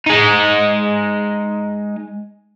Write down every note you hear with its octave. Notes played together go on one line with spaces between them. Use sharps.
G#3 D#4